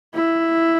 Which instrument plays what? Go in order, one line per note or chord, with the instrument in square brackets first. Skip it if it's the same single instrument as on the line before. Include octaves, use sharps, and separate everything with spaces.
[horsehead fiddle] E4